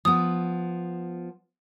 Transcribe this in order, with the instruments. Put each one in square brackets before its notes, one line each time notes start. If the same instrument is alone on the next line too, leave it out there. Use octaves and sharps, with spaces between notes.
[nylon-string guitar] F3 B3 [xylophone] D#6